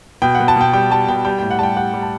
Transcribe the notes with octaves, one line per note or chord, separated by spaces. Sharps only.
B2 G5
F#5
B2
A5
B2 G5
G3 G5
G3 A5
B2 G5
G3 G5
A2 G5
F#5
G3 G5 A5
G3 F#5
G3
A5